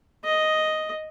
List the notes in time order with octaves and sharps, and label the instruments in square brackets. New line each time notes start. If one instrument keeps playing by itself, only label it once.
[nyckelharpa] D#5